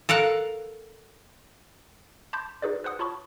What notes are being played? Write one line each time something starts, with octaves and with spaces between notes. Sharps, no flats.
A4 A#4 F5 F#5
A5 B5 C6 D6 G6
D#4 F#4 G#4 B4 C5 D5
B4 C5 F#5 D#6
F4 C#5 A5 B5 C#6